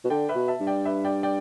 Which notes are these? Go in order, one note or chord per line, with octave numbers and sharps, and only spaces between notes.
B2
D3 D5 G5
B4 E5
B2
E5 A5
G2
D5 G5
B4 E5
D5 G5
D5 G5